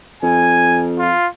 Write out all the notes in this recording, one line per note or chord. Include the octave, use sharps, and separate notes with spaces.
F2 G#5
F4